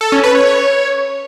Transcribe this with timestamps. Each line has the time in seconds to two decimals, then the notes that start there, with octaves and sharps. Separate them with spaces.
0.01 A4
0.12 C#4
0.24 B4
0.35 C#5
0.46 C#5